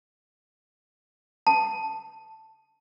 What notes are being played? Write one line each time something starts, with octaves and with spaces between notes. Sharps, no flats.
A5